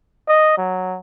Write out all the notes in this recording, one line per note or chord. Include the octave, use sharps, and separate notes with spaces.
D#5
F#3